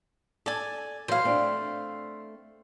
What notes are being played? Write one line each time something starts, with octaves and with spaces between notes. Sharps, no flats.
A4 D5 G#5
E3 F#3 C5 F5
A3 C4 D4